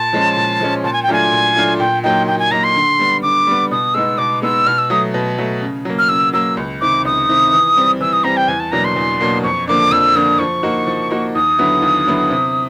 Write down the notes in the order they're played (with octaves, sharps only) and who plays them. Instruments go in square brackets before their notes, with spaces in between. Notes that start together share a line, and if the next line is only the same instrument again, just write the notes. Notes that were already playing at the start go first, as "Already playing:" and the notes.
Already playing: [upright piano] A#2 [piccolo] A5
[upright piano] F3 G#3 C#4
A#2
F3 G#3 C#4
[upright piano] A#2 [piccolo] A5
[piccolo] G#5
G5
[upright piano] F#3 A3 D4 F4 [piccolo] G#5
[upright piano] A#2
F#3 A3 D4 F4
[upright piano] A#2 [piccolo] G5
[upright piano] F#3 A#3 D#4 [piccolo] G5
[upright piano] A#2 [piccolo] G5
[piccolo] G#5
[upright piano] F#3 A#3 D#4 [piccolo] A#5
[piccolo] C6
[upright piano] D3
G3 B3
[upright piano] D3 [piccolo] D6
[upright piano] G3 B3
[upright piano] B2 [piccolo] D#6
[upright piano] G#3 B3 D#4 [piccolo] E6
[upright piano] B2 [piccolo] D6
[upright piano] G#3 B3 D#4 [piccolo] E6
[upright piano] B2 [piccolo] F6
[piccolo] E6
[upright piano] F#3 A3 [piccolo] D#6
[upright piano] B2
F#3 A3
C#3
F#3 A#3
[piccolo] F6
[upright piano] C#3 [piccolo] E6
[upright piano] F#3 A#3 [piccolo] E6
[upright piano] C#2
[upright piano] C3 D#3 [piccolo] D6
[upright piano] C#2 [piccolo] D#6
[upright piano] C3 D#3
E3
G3 C4
[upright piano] E3 [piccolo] E6
[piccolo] D#6
[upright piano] G3 C4 [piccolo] A#5
[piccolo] G5
[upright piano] E2 [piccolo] G#5
[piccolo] A5
[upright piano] B2 F#3 A#3 D4 [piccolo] A#5
[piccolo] C6
[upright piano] E2
B2 F#3 A#3 D4
[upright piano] F2 [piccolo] C#6
[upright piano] D3 F3 A#3 D4 [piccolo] D6
[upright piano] F2 [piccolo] E6
[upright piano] D3 F3 A#3 D4 [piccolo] D#6
[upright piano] F3 [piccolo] C#6
[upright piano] A#3 D#4 F#4
F3
A#3 D#4 F#4
[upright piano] D#2 [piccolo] D#6
[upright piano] D3 F#3 B3 E4
D#2
D3 F#3 B3 E4
C3